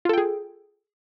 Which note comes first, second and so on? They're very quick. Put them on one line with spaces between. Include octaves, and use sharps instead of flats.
F4 A4 G5 G#4